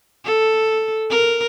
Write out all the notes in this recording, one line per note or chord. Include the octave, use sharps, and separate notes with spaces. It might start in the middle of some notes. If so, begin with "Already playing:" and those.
A4
A#4